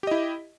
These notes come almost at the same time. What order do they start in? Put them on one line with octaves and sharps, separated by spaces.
G4 D#5 E4